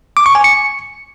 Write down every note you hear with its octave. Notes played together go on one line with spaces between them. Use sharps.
D6
C#6
G#5
C#7